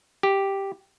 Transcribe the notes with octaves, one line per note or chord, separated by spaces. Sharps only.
G4